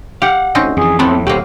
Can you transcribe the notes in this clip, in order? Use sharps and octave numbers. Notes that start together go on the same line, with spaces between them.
G4 F5 F#5
D2 C4 C#4 D#4
F2 E3 G#4
E2 A2 F#3 B3 C4 A5
D1 G1 F#3 A#3 G4 C5